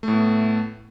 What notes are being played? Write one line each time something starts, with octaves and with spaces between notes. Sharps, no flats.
A2 A3 B3